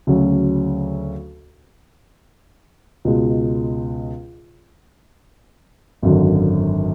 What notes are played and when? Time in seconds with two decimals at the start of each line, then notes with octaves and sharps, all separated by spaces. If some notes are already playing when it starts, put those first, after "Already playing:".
0.07 D2 C#3 F#3 C#4
3.05 C#2 B2 G#3
6.02 G#1 F#2 D3 F#3